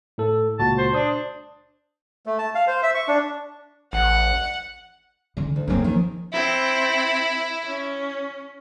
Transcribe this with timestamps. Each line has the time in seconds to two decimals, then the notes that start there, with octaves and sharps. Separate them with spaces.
0.18 A2 A4
0.59 C#2 A#2 F#4 A5
0.78 C5
0.93 D4 C5 D#6
2.26 A3
2.39 A5
2.55 F5
2.67 C5
2.83 E5
2.95 C#6
3.08 D4
3.93 A1 F#5
5.37 D3 E3
5.56 D2
5.68 F#2 C#3 A#3 C4 C#4
5.84 D#2 D#3 F3
6.33 C4 E4
7.64 C#4